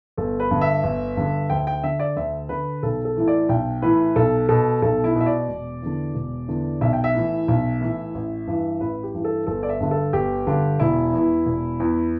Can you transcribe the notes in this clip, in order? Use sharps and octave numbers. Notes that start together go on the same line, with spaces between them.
G1 A4
B4
G2 D3
E5
G1
G2 D3
D2 G5
G5
D3 E5
D5
D2 E5
D3 B4
B1 A4
A4
A2 E3
D5
B1 G5
A2 E3 B4
B1 A4
B2 A4
B1 A4
E4
B2
E5
D5
E1
E2 D3
E1
E2 D3
B1 E5
G5
E5
A2 E3
B1
A2 E3
A1
G2 E3
A1 B4
G4
G2 E3
A4
G1 A4
D5
E5
G2 D3
A4
G1 G4
G2 D3
E1 E4
E2 E3
E1
E2 E3